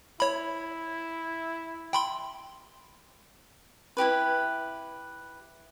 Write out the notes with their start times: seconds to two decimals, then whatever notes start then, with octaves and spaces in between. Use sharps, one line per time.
0.20 E4 C#5 B5
1.93 G5 B5 C6
3.97 E4 F4 G4 B4